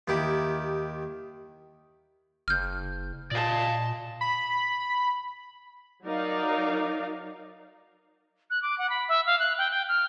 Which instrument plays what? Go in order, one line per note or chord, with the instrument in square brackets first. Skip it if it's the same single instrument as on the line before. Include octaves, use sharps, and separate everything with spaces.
[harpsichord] D#2 D#3 E4 G4
[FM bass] F#1 [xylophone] F6 G6
[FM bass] A#2 [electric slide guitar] D5 F5 [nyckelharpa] D#5 A5
[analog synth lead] B5
[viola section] F#3 D#4 A#4 D5 F5
[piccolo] F#6
D6
F#5
B5
E5
F5
F#6
G5
G5
F6